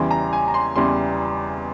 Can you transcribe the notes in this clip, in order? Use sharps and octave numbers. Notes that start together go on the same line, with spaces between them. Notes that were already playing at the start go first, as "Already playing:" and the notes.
Already playing: E2 C#3 E3 G3 C6
A#5
G#5
A#5
C6
E2 C#3 E3 G3 C6